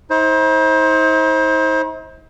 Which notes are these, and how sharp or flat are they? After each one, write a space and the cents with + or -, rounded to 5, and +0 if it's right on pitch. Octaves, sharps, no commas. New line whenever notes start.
D#4 +45 C5 +20